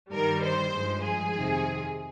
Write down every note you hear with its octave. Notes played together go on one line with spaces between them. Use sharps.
G2 D#3 G3 A#4
C5
G2 F3 G#3
G#4
F2 C3 D#3